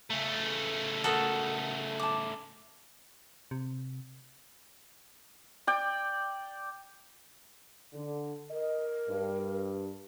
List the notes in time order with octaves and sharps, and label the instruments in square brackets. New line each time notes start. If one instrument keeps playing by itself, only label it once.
[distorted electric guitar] C#3 A3
[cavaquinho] F#4 A#4 D#6 [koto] A4
[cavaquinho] A5 D6
[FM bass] C3
[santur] D5 G5
[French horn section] D3
[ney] A#4 [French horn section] D#5
[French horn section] G2